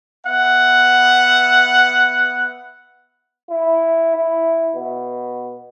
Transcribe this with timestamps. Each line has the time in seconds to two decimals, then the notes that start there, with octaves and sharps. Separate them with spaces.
0.26 B3 E5 F#5
3.49 E4
4.15 E4
4.75 B2